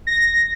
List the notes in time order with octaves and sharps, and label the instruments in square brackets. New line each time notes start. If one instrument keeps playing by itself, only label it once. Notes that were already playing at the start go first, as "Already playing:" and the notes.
[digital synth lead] A#6